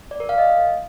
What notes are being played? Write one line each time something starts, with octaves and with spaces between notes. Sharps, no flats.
D5
A#4
F5
D#5